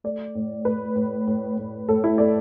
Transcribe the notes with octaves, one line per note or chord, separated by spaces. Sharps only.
A3 D5
A2
A2 B4
A2
A2
A2
A2 A4
E4
A3 D5